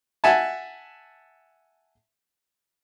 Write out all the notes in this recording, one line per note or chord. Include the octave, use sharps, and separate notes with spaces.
E5 F#5 G#5 A5